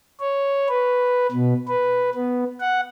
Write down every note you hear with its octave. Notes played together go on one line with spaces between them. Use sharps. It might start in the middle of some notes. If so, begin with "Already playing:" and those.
C#5
B4
B2
B4
B3
F#5